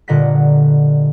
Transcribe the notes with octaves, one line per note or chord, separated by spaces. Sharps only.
G1 A#2 D3 D#5 F#5 B6